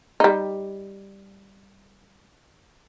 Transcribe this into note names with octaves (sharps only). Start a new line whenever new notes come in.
G3 D#4